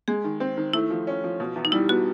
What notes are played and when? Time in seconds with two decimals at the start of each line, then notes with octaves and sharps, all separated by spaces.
0.08 G#3 G#4
0.24 D#3
0.40 C4
0.57 D#3
0.73 A3 E4
0.90 F3
1.07 C#4
1.24 F3
1.40 B2
1.56 E2
1.65 D#4
1.72 G3 E4
1.89 B3 F#4